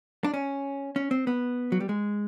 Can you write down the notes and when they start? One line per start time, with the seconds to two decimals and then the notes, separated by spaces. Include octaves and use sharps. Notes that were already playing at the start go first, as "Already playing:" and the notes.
0.24 D4
0.34 C#4
0.96 C#4
1.11 C4
1.27 B3
1.72 F#3
1.80 G3
1.89 G#3